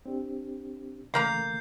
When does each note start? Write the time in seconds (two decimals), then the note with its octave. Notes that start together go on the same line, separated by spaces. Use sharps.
0.06 C4 D4 G4
1.14 C#3 E3 A3 A#3 A#4 A#5 G6 C7